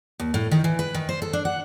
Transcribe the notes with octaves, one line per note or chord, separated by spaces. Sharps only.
D#2
A2
D#3
E3
B4
D#3
C5
A4
D4
F#5